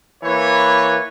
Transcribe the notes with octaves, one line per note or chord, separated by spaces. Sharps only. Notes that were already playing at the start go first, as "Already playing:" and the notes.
E3 A#3 B4 C#5